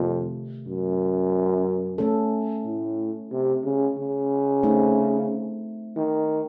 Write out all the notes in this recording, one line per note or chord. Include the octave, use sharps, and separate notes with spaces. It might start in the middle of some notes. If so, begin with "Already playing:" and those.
Already playing: F2 C3 D#3 A3
F#2
A3 C#4 A4
A2
C3
C#3
C#3
A3 C4 D#4
D#3